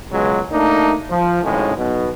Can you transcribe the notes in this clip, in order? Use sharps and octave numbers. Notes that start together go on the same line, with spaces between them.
C#2 B2 F#3 G#3
A3 A#3 D4 D#4
F3
G#1 A2 C#3 G#3
B1 B2